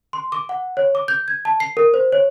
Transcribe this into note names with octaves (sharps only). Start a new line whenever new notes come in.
C6
D6
F#5
C#5
D6
G6
G#6
A5
C7
A#4
C5
C#5